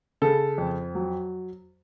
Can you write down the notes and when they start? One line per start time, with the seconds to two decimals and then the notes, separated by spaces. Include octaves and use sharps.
0.22 C#3 A4
0.58 F2
0.95 F#3